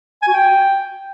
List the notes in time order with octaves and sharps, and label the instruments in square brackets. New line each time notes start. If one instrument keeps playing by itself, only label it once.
[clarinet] G#5
F#4
G5